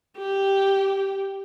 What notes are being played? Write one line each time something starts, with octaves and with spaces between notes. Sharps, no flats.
G4